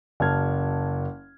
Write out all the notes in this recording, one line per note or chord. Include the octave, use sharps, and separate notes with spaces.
F#1 A5 F6 G#6